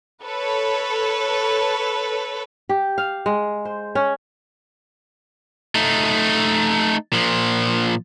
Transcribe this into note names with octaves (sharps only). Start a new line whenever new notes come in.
A4 B4 C#5
G4
F5
G#3
C5
C#4
A3 D#4
A#2 F3